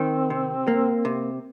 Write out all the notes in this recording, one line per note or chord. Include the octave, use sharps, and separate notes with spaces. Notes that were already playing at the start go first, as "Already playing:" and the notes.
Already playing: D#3 C4
C3
A#3
C3